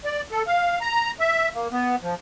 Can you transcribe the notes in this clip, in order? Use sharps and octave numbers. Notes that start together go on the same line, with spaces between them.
D5
A4
F5
A#5
E5
A#3
B3
F3